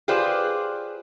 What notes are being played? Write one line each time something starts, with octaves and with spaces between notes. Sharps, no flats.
F4 G4 G#4 B4 C5 D5